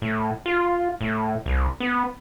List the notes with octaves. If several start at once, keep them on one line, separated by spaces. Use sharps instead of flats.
A2
F4
A2
C2
B3